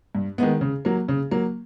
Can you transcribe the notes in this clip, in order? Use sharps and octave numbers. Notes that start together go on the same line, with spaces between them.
G2
D#3 G#3 B3
C#3
F#3 A#3
C#3
F#3 A#3